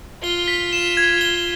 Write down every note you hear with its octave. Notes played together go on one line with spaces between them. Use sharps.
F4 G7
B6
E7
G#6
G7